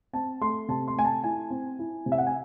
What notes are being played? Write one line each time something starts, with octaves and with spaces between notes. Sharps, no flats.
C4 A5
A3 C6
C3 A5
C6
A3 G#5
A5
E4 G#5
C4
E4
C3
E5
F#5
G#5